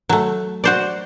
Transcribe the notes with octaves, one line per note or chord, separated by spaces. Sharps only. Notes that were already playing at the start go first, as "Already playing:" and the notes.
F#3 A3
F#4 C5 D5